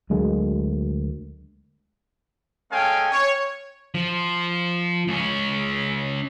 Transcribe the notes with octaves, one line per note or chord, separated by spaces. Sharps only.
D2 F#3 G#3 A#3
G#3 C#4 A4 F5 G5 G#5
C#5
F3
C#2 C#4